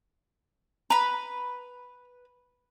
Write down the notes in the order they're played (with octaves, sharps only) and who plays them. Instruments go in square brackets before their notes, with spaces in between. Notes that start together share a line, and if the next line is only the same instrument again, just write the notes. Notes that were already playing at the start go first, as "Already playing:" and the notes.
[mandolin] B4 B5 [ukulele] A#5